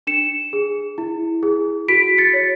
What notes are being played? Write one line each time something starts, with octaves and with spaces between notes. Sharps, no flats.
D4 C#7 E7
G#4
E4
G#4
F#4 B6 D7
A6 C#7
C#5